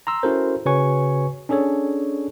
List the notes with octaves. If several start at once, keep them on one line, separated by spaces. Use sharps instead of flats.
A#5 C6 E6
C#4 E4 F#4 A4 A#4 C5
C#3 F#4 B4 C#5 G#5 C#6
C#4 D4 G#4 A4 C#5